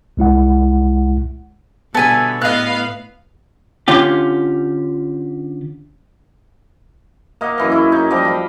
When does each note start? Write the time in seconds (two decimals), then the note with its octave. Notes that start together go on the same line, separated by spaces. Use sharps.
0.17 C2 G#3 E4 F#5
1.95 B2 D3 G3 B3 E5 G#5 A5
2.42 A2 B3 B4 D#5 F5 F#6
3.88 D3 C#4 F4 G4
7.41 A#3 D#5 F5 F#5
7.58 F#2 E3 D#5
7.70 C#4 E4 G#4
7.92 D#4
8.10 F3 G3 D#5 D6
8.25 F5 B5